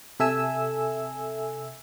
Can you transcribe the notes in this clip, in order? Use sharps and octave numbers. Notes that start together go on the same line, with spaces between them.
C3 A4 E5 G#5 E6